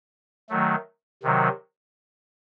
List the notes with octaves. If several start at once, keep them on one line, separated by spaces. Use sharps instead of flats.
D#3 F#3 A3
C3 D#3 F#3